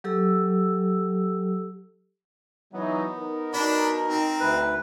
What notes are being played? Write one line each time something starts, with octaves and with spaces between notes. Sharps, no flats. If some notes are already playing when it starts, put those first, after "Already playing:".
F#3 G4 A4 E6
E3 F#3 B3 D#4
D#4 A#4
B2 D4 B5
C4
D2 B4